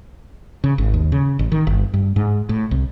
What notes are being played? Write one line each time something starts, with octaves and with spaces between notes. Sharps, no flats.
C#3
G#1
D#2
C#3
A1
D#3
G1
G2
G#2
A2
C2